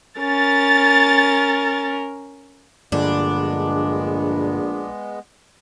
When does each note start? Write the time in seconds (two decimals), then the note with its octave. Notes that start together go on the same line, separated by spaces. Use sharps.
0.20 C#4 A#4 A6
2.92 A#1 G2 D3 G#3 B3 D4